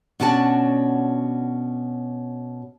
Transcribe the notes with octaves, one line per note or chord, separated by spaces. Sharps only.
B2 C#4 D4 F#4 G#5 A5